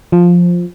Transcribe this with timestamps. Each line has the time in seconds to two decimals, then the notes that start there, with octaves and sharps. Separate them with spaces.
0.12 F3